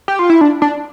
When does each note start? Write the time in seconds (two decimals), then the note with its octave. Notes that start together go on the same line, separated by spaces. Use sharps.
0.08 G4
0.19 F4
0.30 E4
0.41 D4
0.62 D4